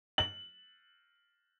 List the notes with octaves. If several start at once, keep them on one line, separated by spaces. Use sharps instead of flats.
F#7